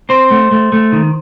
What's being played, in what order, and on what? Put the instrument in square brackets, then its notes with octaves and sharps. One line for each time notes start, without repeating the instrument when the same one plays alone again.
[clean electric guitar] C4 C5
A3
A3
A3
D#3